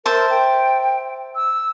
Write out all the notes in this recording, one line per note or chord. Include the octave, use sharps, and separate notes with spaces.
A#4 C5 E5 A5
G5
E6